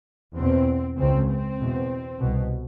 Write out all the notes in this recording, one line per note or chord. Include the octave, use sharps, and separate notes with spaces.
E2 B2 C4
C#2 C#3 C4
C4
E2 B2
C2 B2